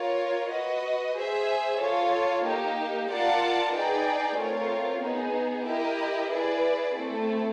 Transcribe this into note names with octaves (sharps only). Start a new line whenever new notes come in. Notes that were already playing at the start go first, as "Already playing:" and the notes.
Already playing: F4 A#4 C#5
F#4 B4 D#5
G#4 C5 E5
F4 A4 C#5
A#3 D#4 G4
F4 A#4 D5 F#5 A5
D#4 G#4 B4 D5 G5
A3 C4 F4 A#4 C#5
B3 D#4 G#4
E4 G4 A#4 D#5
E4 G#4 B4 D5
A3 C4 E4 A4